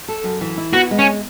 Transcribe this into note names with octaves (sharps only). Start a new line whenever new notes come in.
A4
F#2
E3
E4
B3 F#4
G#3
C#4